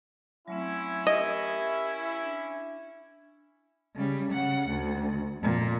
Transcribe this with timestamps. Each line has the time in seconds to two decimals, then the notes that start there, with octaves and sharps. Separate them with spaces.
0.48 F#3 A3 C4 C#4 E4
1.07 G4 A#4 D#5
2.23 D4
3.95 C#3 G3
4.32 C#3 F#5
4.69 D2
5.41 F2 A#2